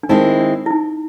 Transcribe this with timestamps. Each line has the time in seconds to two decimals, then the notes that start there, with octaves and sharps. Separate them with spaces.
0.03 D4
0.09 D#3 G#3 C4 D#4 E4
0.40 D4
0.66 E4
0.70 D#4